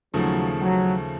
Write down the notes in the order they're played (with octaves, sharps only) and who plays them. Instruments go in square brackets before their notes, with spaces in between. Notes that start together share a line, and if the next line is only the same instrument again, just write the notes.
[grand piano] D#2 C#3 F3 A3 [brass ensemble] F#3
[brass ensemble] F#3